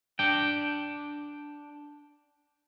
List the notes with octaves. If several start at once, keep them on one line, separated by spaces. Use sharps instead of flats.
D4 G5